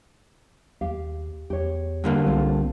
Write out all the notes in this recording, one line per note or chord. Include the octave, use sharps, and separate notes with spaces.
D#2 G4 F5
E2 G4 C#5
G2 D3 A#3
C2 C4 F4 A4